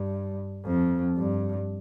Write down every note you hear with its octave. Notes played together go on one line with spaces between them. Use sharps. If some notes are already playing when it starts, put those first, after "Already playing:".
Already playing: G2
F2
G2